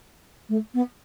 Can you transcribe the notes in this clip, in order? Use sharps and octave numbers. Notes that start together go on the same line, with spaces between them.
A3
B3